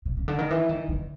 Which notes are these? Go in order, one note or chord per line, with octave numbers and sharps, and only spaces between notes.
C3
C#3
D3
D#3
E3
D#3
D3